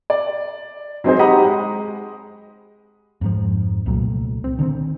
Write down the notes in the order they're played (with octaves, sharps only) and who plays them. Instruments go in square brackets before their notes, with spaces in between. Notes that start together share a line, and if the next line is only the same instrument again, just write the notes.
[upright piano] D5
F#3 G#3 C4 D#4 G#4 C5
G4 D#5 F#5 A#5 B5 D#6
G#3
[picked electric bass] F2 G#2 F3
C2 A#2 F#3 A3
C4
D3 D#3 A3 C4